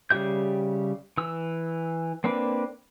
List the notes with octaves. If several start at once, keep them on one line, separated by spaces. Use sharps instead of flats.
C#3 G3 G4 E5 G6
E3 E6
A#3 C4 D4 B4